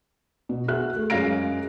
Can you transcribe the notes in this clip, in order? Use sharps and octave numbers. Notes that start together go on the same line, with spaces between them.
B2
F#4 G#4 E5 F#6
A3
F#2 G#3 F5 A#6 D7